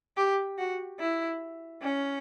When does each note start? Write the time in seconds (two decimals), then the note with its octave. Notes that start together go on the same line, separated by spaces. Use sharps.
0.17 G4
0.58 F#4
1.00 E4
1.82 C#4